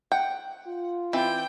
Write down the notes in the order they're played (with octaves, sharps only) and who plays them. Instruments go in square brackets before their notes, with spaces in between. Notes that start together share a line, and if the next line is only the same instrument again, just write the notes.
[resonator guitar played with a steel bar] F#5 [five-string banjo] G5
[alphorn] F4
[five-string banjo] E3 [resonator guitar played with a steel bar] C4 D5 [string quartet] G5